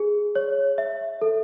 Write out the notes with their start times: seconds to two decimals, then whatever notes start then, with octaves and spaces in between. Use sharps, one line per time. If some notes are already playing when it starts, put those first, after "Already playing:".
Already playing: G#4
0.35 C#5
0.78 E5
1.22 A4